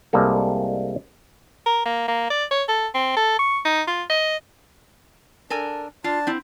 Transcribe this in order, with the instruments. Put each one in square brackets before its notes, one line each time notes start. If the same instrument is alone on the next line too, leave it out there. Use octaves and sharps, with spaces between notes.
[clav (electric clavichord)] C2 G3 G#3 A#3 A4
[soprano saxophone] A#4
A#3
A#3
D5
C#5
A4
C4
A4
C#6
D#4
F4
D#5
[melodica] D4 [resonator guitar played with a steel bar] A4 A#4 G#5
[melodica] D4 A5 [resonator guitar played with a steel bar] F4
[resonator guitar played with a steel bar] C4 E4